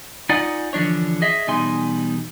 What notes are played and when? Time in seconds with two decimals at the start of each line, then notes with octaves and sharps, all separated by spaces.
0.29 D#4 F4 D5 D#5 F#5 G#5
0.73 D3 E3 F3 D4 C#5
1.22 G#4 D#5 E5
1.47 E2 B2 G3 D#4 G#5 C6